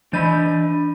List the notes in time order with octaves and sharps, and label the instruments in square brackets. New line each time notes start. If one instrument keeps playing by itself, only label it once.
[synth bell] E3 G6 D#7 [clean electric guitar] D4 D#5 B5